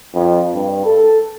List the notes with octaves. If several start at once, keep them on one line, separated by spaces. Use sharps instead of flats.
F2
G2
A4